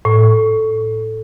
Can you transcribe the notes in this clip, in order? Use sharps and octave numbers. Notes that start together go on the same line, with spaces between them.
A2